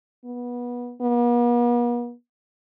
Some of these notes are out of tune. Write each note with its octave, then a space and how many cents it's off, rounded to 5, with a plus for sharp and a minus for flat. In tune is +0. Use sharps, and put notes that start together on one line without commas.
B3 -20
B3 -45